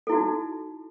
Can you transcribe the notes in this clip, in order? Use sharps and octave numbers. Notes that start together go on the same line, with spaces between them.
D#4 E4 F#4 A4